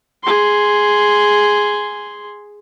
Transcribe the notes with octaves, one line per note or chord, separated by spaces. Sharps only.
G#4 C6